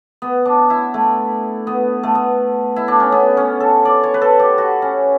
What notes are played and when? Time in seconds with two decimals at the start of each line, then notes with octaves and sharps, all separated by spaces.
0.22 B3
0.45 D4
0.70 E4
0.94 A3
1.67 B3
2.03 A3
2.15 B3
2.76 E4
2.88 D4
3.00 C#4
3.12 B3
3.37 C#4
3.60 A4
3.85 D5
4.03 C#5
4.14 B4
4.22 A4
4.39 G4
4.58 F#4
4.82 C#4